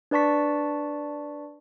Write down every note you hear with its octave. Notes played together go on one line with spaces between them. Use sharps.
D4 B4 D5 A5 C#6 B6